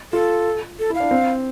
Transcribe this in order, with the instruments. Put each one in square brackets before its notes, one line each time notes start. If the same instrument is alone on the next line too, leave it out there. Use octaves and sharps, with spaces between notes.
[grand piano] F4 [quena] A4
[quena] A4
[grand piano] E4
[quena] F5
[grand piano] D4
C4